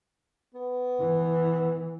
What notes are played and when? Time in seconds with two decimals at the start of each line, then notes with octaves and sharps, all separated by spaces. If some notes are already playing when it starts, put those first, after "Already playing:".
0.54 B3
1.00 E3